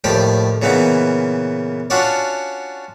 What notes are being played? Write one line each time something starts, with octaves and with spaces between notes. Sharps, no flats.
D#2 A2 F3 G4 D5 G5
A#2 C#3 E3 A#3 B3 D#4
C#4 D4 F4 F#4 C#5 D5